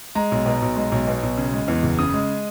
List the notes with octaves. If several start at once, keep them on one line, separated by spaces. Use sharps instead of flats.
G#3 A#5
B1
B2
B1
G#3
B1
B2
B1
C#3
G#3
E2
F#1
C#3 D#6
G#3